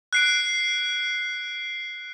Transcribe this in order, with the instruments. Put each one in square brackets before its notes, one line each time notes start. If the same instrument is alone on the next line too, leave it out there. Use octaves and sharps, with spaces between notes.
[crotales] F#6 C7 D7